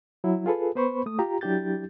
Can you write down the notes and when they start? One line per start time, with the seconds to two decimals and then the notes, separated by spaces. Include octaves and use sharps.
0.24 F#3 E4
0.46 F4 G#4 A4 B4
0.75 B3 B4 C5 B5 C#6
1.06 A3 D#6
1.19 F4 G4 A#5
1.41 F#3 D4 E4 G4 G6 A6